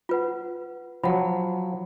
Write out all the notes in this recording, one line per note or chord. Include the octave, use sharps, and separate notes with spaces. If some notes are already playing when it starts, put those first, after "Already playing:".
F4 B4 F#5
F3 F#3 F#5 B5